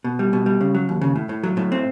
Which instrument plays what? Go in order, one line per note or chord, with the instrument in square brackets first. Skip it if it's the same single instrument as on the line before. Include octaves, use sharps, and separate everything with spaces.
[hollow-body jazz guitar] B2
G3
B2
G3
C#3
F#3
D#2
C#3
A2
A2
F#3
A2
C4